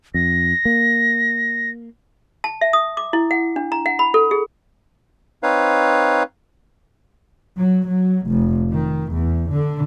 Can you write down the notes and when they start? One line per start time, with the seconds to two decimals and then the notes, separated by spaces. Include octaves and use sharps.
0.14 F2 A#6
0.65 A#3
2.44 A5
2.61 E5
2.73 D#6
2.97 D6
3.13 E4
3.31 F#5
3.56 D4
3.72 A#5
3.86 F#5
3.99 B5
4.14 A4
4.31 G#4
5.43 C4 D#4 B4 C#5 F5
7.56 F#3
7.89 F#3
8.27 F1
8.72 D#3
9.13 E2
9.52 D3